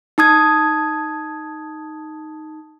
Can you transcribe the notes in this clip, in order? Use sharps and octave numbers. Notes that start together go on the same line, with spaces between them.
D#4 A5 D#6 G#6